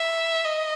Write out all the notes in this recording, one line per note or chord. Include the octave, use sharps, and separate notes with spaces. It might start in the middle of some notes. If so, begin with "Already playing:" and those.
Already playing: E5
D#5